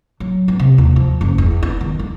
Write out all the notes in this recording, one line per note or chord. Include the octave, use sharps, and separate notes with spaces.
F#3
B3
C3
D#2
F3
F#1
E2
B3
D#3
A#3